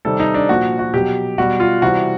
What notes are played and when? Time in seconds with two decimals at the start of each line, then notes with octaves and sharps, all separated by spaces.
0.05 C3 D#3 G3 A4
0.20 D#4
0.34 D4
0.49 A#2 F3 F#4
0.79 F#4
0.94 B2 F#3 G4
1.38 B2 G3 F#4
1.60 F4
1.82 C3 E3 G3 F#4